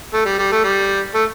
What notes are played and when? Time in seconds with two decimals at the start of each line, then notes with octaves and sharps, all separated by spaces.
0.14 A3
0.26 G3
0.38 G3
0.52 A3
0.64 G3
1.14 A3